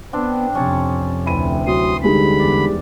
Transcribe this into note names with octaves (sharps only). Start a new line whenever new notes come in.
B3 C4 D4 G5
F2 C3 C#4 A5
D2 C3 E3 C4 B5 D#7
F#3 C6 D#6
D3 G3 G#3 D#4 B5
E2 D5